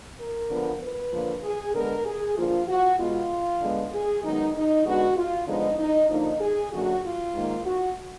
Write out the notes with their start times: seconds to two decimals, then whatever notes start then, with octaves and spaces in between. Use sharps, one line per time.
0.19 A#4
0.50 D3 F3 B3
0.81 B4
1.12 D3 F3 A#3
1.43 G#4
1.74 D3 G#3 B3 A#4
2.05 G#4
2.36 D3 F3 A#3 F4
2.67 F#4
2.99 B2 G#3 B3 F4
3.61 D3 G#3 B3
3.92 G#4
4.23 F#2 D#3 G#3 B3 D#4
4.54 D#4
4.85 D3 G#3 B3 F#4
5.17 F4
5.47 D3 F3 G#3 B3 D#4
5.79 D#4
6.10 D3 F3 A#3 D#4
6.41 G#4
6.72 F#2 D3 F#3 A#3 F#4
7.03 F4
7.34 G#2 D#3 A#3
7.65 F#4